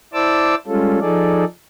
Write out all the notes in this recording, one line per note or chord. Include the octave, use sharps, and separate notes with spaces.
E4 C5 D5 A5 D6 E6
G3 G#3 C#4 F4 A4
F3 D#4 G#4 A4 D5